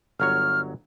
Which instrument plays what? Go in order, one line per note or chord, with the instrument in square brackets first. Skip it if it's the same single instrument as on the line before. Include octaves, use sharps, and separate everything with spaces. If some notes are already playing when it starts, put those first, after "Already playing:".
[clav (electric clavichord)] G1 F#3 C#5 [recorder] F6